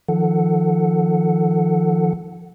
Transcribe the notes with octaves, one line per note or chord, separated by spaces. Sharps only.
D#3 F3 A4 F#5